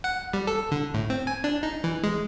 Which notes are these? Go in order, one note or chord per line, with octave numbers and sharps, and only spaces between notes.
F#5
G3
A4
D3
A2
C4
G#5
D4
D#4
E3
G#3